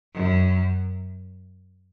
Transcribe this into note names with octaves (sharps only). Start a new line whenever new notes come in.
F#2